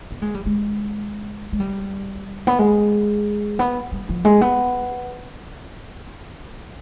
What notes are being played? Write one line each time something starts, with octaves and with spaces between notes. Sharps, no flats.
B3
G#3
G3
G#3
G#3
G3
B3
G#3
B3
G3
F3
G#3
B3